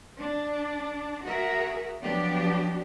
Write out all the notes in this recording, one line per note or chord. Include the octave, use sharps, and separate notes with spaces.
D4
F#4 G#4 A#4 E5
F3 F#3 B3 D4 F#4 G4